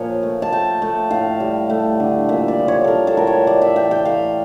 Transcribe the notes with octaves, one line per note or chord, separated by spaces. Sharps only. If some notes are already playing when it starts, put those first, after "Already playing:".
Already playing: A#2 F3 C#5
A3
A5
A3 G5
A3
A2 F5
G3
A3
D3
A#2 E5
D5
F3
C#5
G3 A4 A#4
A4
A2 A#4
C#5
A3 D5
E5
E3 G5
G5
A3 F5